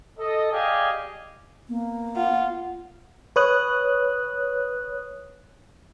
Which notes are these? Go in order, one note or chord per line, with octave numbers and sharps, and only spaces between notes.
A4 D#5
G4 G#4 D5 D#5 F5 G#5
A#3 B3
F4 F#5
B4 C#5 D#6 F#6